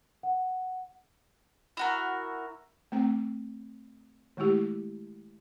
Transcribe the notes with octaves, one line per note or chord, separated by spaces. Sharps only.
F#5
E4 F#4 A#4
A3 C4 G5
D#3 G#3 A3 E4 G4